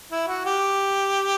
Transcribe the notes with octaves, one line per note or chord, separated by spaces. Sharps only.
E4
F#4
G4